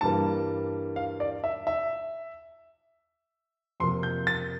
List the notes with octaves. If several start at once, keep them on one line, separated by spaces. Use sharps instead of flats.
G2 E3 G3 A#3 A5
F5
D5
E5
E5
F2 C3 F3 A#3 C6
G6
A6